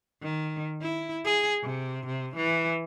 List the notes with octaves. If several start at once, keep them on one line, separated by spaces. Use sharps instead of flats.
D#3
E4
G#4
C3
C3
E3